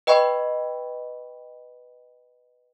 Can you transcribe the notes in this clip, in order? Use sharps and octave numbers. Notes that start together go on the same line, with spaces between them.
B4 D#5 G5 B5 C#6